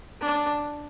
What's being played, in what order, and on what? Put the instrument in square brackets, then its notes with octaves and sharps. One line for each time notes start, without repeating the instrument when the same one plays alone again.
[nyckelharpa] D4